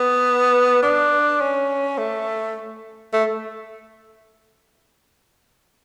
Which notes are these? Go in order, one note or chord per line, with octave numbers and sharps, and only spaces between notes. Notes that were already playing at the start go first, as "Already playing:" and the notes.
Already playing: B3
D4
C#4
A3
A3